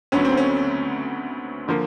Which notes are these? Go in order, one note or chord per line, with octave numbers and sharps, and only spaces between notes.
D2 D3 F#3 B3 C#4
C4
C#4
D3 F3 A#3